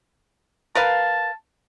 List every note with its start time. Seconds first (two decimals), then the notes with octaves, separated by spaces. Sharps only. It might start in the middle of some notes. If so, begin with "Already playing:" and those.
0.75 A#4 B4 F5 A5